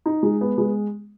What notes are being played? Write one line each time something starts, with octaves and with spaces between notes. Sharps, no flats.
D#4
G#3
B3
G#3